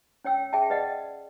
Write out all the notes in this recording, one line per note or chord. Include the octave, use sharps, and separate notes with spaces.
C#4 C#5 G5 E6
G#4 E5 G5 A5
B4 D5 D#5 F#5